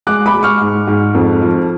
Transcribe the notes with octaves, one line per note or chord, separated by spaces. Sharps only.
G#3 D6 F#6
B5 D6
G#3
C#6 F6
G#2
G#2
F2
F3